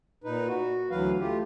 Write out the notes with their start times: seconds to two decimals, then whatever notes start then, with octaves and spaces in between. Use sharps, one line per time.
0.24 A#2 D#4 B4
0.47 F#4
0.90 D2 E3 F#3 B4 F5
1.20 A3 F4 G4